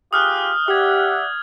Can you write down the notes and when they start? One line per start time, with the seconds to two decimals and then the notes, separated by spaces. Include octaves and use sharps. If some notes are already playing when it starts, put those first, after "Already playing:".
0.13 F4 G4 G#4 D#6 F6 F#6
0.68 G4 D5 E5 F#5 D#6 G#6